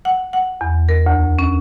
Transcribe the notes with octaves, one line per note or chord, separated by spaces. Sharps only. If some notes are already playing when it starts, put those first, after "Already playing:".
F#5
F#5
E2
A#4
D2
C#4